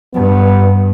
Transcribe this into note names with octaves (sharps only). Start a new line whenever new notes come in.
G2 B3